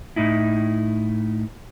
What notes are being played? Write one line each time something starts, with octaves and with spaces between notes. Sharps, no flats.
A2 D#4 E4